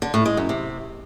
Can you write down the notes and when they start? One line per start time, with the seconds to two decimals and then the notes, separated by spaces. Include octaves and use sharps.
0.02 D3
0.14 A2
0.26 G#3
0.37 F#2
0.49 C3